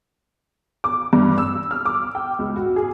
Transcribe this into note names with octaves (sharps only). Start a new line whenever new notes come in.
D6
G2
E6
F6
D6
G5
C#2
F#4
G#4